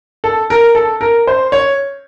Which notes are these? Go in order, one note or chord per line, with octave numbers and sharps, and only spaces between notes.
A4
A#4
A4
A#4
C5
C#5